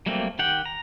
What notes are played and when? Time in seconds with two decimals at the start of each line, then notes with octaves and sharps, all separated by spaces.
0.06 F#3 G3 A3 A#3 C4
0.39 D#3 G4 F#5 G5
0.65 A#5